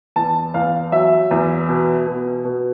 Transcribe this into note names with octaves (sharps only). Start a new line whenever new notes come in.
E2 A5
E2 F5
F#3 E5
E2
B2
B2
B2